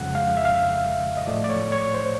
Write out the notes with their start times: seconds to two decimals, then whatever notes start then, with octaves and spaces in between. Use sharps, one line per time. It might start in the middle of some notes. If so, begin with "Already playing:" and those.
Already playing: F2 C#3 F3 G#3 F#5
0.15 F5
0.37 E5
0.45 F5
0.54 E5
1.17 D#5
1.27 A2 F3 A3 D5
1.44 D5
1.49 C#5
1.72 C#5
1.94 C5